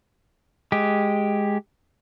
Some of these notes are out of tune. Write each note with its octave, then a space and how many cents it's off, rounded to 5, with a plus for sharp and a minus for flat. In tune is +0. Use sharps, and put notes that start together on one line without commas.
G#3 +0 G4 +0